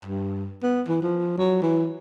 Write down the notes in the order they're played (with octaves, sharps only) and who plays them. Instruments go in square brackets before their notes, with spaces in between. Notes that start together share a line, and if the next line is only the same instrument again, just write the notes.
[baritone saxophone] G2
B3
E3
F3
F#3
E3